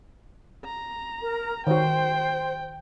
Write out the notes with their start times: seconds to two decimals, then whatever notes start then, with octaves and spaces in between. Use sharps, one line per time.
0.65 A#5
1.22 A#4
1.67 D#3 F#4 C5 G5